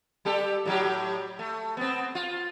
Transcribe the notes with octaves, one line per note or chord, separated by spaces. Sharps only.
G3 G4 A4
A2 F#3 G4
A3
B3 C4
F4